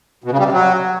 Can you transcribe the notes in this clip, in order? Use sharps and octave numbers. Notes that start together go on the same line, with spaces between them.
B2
C#3
G3
C3
F#3